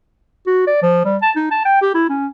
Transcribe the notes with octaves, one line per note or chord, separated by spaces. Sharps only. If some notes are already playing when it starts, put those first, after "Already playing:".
F#4
D5
F3
G3
A5
D#4
A5
G5
G4
E4
C#4